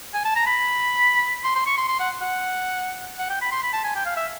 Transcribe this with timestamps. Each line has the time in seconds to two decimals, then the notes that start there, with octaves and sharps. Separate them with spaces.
0.14 G#5
0.25 A5
0.36 A#5
0.47 B5
1.44 C6
1.55 C6
1.66 C#6
1.77 C6
1.88 C6
2.00 F#5
2.21 F#5
3.19 F#5
3.30 G5
3.41 B5
3.52 C6
3.62 B5
3.73 A5
3.84 G#5
3.95 G5
4.05 F5
4.16 E5